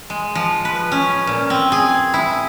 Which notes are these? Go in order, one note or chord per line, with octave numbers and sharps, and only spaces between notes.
G#3
F3
B4
C#4
A#2
C4
G#4
E4